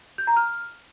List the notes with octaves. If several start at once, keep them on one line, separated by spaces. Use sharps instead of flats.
G6
A#5
F6